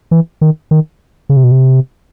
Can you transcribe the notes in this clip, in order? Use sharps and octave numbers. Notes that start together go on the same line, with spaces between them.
E3
D#3
D#3
C#3
C3
B2
C3